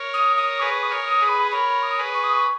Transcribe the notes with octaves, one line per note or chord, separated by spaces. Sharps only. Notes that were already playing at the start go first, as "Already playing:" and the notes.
Already playing: A#4 C#5
D#6
D#6
G#4 B4 C#6
D#6
A#4 C#5
D#6
G#4 B4
B5
A#4 C#5 B5
D#6
G#4 B4
C#6
D#6
C#6